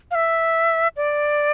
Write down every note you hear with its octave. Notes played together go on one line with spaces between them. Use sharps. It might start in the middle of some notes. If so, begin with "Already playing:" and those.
F5
E5
D5